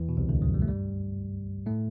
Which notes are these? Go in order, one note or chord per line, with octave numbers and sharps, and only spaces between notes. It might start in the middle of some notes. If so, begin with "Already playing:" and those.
Already playing: E2 E3
B2
C2 C3
D2 D3
F#2 F#3
G3
A3
G2 G3
A2 A3